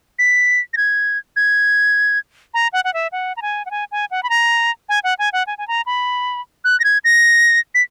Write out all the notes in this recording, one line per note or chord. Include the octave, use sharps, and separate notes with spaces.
B6
A#6
G#6
G#6
A#5
F#5
F#5
E5
F#5
A#5
G#5
F#5
G#5
G#5
F#5
B5
A#5
G#5
F#5
G#5
F#5
G#5
G#5
A#5
B5
F#6
A#6
G#6
A#6
B6